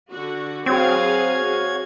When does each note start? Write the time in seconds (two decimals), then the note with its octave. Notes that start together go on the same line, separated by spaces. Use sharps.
0.10 D3 F#4
0.66 F#3 C4 F#4 G#4 C#5 F5 G#6